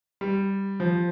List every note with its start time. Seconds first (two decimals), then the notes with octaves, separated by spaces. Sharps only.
0.21 G3
0.80 F3